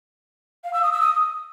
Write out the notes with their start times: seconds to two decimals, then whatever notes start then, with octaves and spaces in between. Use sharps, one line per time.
0.64 F5
0.73 E6
0.83 D#6
0.92 E6
1.01 D#6